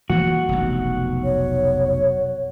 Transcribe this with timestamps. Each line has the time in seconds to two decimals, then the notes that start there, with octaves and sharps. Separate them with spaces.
0.10 E3 F3 A#3 F#4
0.49 F1 B1
1.24 C#5